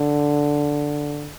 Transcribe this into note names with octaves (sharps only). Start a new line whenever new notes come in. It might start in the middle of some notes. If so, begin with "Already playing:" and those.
Already playing: D3